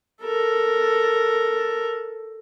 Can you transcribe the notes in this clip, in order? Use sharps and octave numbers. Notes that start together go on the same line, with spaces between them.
A4 A#4